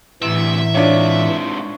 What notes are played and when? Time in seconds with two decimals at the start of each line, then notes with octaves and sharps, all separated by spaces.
0.22 D2 A2 C3 E3 E5
0.75 G#2 C3 D4 F4 C#5